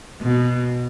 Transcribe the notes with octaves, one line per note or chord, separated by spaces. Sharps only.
B2